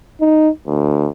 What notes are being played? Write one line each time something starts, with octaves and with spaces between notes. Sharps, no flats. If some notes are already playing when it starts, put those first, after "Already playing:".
D#4
D2